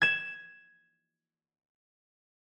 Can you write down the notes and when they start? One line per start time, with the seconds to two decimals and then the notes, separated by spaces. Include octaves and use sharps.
0.02 G#6 E7